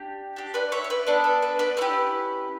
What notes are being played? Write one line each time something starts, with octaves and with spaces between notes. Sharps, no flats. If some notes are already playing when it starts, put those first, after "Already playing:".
Already playing: D4 G4
D4 G4
B4 D5
C#5 E5
C#5
B4 D5
B3 D4 A4 B4
A4
B4
B4 D5
A3 C#4 E4 G4 B4